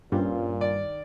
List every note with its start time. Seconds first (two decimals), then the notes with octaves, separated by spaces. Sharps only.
0.12 G2 A#2 C4 C#4 F4
0.61 D#3 D5